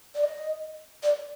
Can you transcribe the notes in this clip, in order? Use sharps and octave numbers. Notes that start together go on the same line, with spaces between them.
D5
D#5
D5